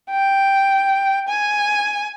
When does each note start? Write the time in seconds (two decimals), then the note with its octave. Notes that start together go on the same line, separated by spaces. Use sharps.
0.10 G5
1.28 G#5